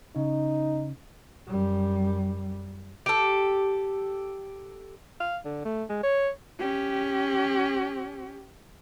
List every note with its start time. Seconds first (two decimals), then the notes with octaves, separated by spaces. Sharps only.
0.16 C#3 D#4
1.47 F#2 G3
3.06 G4 A4
5.20 F5
5.45 D3
5.65 A3
5.90 G#3
6.03 C#5
6.59 C#4 G4